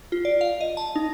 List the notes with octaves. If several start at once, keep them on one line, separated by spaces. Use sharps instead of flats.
F4
D5
F5
D#5
A5
D#4